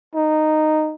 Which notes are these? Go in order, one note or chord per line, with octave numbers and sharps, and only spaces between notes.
D#4